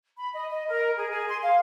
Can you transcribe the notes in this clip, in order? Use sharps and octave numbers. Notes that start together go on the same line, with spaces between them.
B5
D#5
D#5
A#4
G#4
G#4
C6
F5